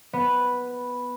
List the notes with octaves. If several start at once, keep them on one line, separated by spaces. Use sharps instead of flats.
B3